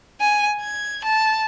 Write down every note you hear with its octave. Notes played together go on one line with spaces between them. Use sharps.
G#5
G#6
A5